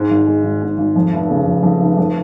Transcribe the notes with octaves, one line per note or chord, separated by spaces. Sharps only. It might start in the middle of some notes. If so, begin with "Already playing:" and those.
Already playing: G#2
G#1
G#3
G#1
G#2
G#1
F2
F1
C#3
F1
F2
F1
F2